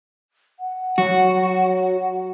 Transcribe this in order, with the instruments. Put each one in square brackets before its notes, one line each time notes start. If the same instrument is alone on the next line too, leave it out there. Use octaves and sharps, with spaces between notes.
[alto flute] F#5
[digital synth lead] F#3 [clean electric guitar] F#4